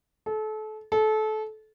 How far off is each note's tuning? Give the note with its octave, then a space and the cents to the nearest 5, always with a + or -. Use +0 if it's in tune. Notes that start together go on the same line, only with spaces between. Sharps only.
A4 -30
A4 -25